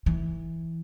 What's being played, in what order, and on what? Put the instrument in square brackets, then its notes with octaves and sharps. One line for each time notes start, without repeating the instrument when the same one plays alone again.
[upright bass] E3